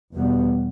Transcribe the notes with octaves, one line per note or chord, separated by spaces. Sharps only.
E2 B2 G3 B3